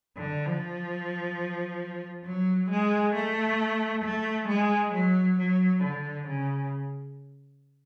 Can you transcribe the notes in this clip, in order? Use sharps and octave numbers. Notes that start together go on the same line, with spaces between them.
D3
F3
F#3
G#3
A3
A3
G#3
F#3
F#3
D3
C#3